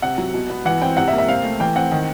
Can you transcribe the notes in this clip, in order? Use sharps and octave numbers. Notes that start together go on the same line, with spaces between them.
C3 F#5
F#3
B2
B3
E3 F#5
C4 G5
C3 F#5
E5
A#3
E5
C4 F5
A3
E3 G5
C4 F#5
D#3